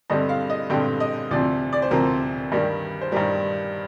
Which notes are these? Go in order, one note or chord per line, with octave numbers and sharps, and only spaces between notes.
G2 D3 G3 C4 D#5
F5
D#5
G2 D3 G3 C4 G5
D#5
D2 C3 F3 C4 D5
D5
C5
D2 C3 F3 C4 A#4
G2 D#3 G3
C5
G2 D#3 G3 A#4